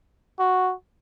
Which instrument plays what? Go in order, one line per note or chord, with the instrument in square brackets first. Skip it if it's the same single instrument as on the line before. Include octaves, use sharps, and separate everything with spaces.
[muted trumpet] F#4